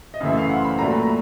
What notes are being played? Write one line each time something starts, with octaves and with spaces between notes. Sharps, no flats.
D#5
F#2 C#3 E3 A3 E5
F5
F#5
C6
B5
A#2 F#3 A3 A#5
B5
A#5